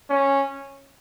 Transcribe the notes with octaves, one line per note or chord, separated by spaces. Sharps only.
C#4